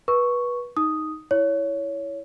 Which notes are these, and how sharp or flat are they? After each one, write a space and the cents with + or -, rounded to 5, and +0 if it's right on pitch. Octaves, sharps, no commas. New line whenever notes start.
B4 -25 C#6 +0
D#4 +5 D#6 +0
E4 +0 C#5 +15